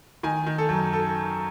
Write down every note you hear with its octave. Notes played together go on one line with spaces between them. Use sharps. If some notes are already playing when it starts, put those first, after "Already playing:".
D#3 G#5
D#3
A4
F#2
A4